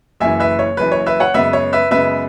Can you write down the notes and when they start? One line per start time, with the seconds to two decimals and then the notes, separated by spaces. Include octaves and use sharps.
0.20 F#1 F#2 E3 E5 G#5
0.40 B4 E5
0.59 C#5
0.77 F#1 F#2 E3 B4
0.92 C#5
1.06 B4 E5
1.20 C#5 F#5
1.34 F#2 C#3 G#3 B3 B4 E5
1.53 C#5
1.73 B4 E5
1.91 F#2 C#3 G#3 B3 B4 E5